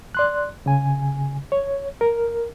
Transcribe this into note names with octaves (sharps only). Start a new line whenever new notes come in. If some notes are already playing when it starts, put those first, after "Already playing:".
D5 C6 F#6
C#3 G#5
C#5
A#4